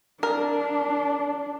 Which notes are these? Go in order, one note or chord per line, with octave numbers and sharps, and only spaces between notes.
D4 A#4